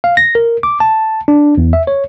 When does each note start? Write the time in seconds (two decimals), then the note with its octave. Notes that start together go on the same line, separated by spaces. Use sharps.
0.04 F5
0.17 A#6
0.35 A#4
0.63 D6
0.80 A5
1.28 D4
1.58 E2
1.73 E5
1.87 C#5